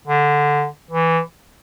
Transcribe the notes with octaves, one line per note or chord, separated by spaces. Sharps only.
D3
E3